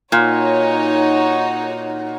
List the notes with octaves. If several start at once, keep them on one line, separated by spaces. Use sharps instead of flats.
A#2 D#4 F#4 C#5